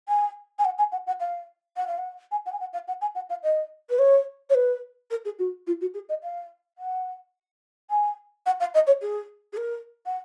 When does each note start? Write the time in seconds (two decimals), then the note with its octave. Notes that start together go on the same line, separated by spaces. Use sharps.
0.08 G#5
0.59 G#5
0.65 F#5
0.78 G#5
0.92 F#5
1.07 F#5
1.20 F5
1.77 F#5
1.87 F5
1.98 F#5
2.31 G#5
2.46 F#5
2.52 G#5
2.60 F#5
2.73 F5
2.88 F#5
3.01 G#5
3.15 F#5
3.30 F5
3.43 D#5
3.90 B4
3.99 C#5
4.50 C#5
4.54 B4
5.11 A#4
5.25 G#4
5.39 F#4
5.67 F4
5.81 F#4
5.94 G#4
6.09 D#5
6.23 F5
6.78 F#5
7.90 G#5
8.46 F#5
8.60 F5
8.74 D#5
8.87 C#5
9.02 G#4
9.53 G#4
9.57 A#4
10.06 F#5